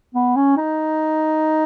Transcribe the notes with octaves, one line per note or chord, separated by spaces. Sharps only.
B3
C#4
D#4